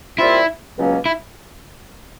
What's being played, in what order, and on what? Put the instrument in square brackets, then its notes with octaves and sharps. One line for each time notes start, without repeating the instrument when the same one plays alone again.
[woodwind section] A#2 G3 C4 F4 [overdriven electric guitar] E4
[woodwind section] C#2 B2 F#3 A#3 C#4
[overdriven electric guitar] E4